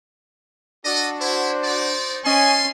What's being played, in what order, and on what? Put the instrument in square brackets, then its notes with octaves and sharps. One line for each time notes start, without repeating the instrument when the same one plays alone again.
[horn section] D4 F#4 [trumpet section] A4 D#5
[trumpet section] E4 [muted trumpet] C5
[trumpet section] D#4 D5
[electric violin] C#4 [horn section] C#5 D#5 G#5 [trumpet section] A5 C6